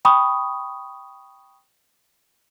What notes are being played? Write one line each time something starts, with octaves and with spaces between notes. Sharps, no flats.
G5 B5 C#6 D#6